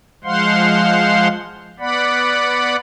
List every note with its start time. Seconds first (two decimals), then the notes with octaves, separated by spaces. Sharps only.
0.24 F3 G#3 C5 F5 F#5 C6
1.80 B3 D5 F#5 B5